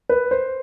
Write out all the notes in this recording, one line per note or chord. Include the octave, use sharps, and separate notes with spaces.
B4
C5